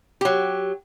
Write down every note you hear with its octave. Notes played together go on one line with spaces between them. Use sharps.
F#3 G4